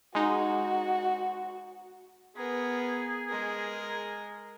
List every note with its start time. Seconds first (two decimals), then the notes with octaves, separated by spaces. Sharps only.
0.15 G#3 D#4 F#4
2.36 B3 G#4 A#4
3.29 G#3 A#4